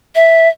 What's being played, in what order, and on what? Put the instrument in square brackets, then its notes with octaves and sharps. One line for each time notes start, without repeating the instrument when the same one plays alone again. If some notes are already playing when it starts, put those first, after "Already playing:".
[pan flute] E5